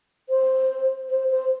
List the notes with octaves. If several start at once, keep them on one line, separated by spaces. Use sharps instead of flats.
C5
C5
C5